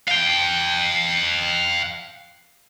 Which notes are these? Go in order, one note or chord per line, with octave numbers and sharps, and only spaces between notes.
F5 G5